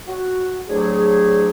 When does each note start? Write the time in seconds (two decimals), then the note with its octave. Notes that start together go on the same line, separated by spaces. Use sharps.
0.07 F#4
0.68 D2 A2 F#3 A3 G4 G#4